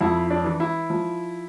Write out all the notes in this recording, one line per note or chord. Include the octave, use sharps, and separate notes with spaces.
F2 E4
D4
E3
E4
F3